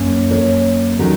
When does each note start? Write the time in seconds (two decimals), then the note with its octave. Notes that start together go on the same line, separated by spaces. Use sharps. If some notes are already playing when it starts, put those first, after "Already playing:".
Already playing: F#2 A#3 C#4
0.30 A#4 C#5
0.99 D#3 F#3 C#4 F#4 A#4